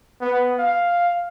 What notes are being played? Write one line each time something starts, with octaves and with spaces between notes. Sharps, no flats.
B3
F5